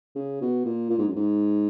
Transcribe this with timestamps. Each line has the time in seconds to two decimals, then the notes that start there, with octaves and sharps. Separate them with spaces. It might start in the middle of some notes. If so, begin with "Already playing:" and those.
0.16 C#3
0.41 B2
0.65 A#2
0.90 A#2
0.99 G#2
1.08 F#2
1.16 G#2